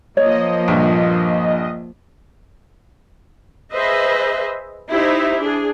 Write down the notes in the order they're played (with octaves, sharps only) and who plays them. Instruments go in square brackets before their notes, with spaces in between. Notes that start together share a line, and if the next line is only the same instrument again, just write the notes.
[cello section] F3 A#3 [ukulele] C#5 [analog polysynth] D#5
[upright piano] A#1 G2
[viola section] G#4 B4 C5 D#5 E5
D#4 E4 G4 C5 E5
D4 G#4